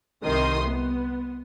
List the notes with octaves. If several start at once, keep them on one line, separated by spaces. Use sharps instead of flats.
C2 C3 D#3 C6 D#6
B3